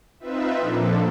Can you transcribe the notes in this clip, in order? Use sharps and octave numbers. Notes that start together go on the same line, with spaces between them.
C4 D#4 F4 B4 E5
A#2 F3 A#3 D4 A4